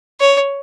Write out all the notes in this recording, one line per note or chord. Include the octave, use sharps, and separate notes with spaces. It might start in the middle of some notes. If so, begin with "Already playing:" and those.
C#5